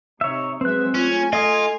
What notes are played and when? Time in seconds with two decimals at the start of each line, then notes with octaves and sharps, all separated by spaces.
0.21 C3 D#4 C#5 E5
0.61 F#3 G#3 C4 B4 E5 F#6
0.94 A3 C#4 F4 G#5 G#6
1.33 F4 A4 D#5 D#6